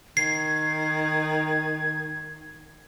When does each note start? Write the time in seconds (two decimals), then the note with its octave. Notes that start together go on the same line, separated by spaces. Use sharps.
0.17 D#3 G#6 C7